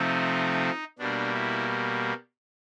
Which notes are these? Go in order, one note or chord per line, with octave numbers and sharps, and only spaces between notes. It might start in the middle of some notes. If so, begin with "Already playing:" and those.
Already playing: C3 F3 A3 C4 D#4
B2 G3 A#3 D4
E4